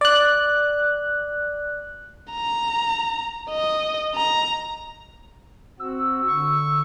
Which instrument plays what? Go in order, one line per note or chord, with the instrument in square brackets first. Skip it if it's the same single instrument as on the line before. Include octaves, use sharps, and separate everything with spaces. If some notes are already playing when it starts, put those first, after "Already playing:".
[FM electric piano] D5 F#6
[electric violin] A#5
D#5
A#5
[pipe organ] C4 F#4 [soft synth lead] E6
[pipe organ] D3 C#6